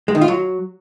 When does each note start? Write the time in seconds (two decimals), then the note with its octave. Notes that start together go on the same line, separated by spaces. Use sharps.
0.08 G#3
0.15 D#3
0.21 F4
0.28 F#3